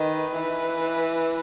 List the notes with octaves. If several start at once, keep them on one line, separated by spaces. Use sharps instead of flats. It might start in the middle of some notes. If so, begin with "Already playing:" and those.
Already playing: D#3 B4
E3